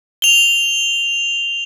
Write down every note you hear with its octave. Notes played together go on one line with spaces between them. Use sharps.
F7 G7